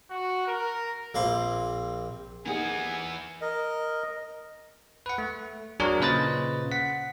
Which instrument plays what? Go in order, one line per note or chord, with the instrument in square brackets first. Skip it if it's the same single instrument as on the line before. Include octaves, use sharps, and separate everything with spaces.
[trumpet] F#4
A#4
[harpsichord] A#1 A#3 C4 C6
[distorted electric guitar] E3 F#5 [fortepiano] A#3 D#4 G#4 [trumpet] G#5
[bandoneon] A#4 D#5
[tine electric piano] B4 F#5
A3
F#3 D4 G#4 A#4 C#5
A#2 C#3 B4 C5 D#5 A6
F#5 B6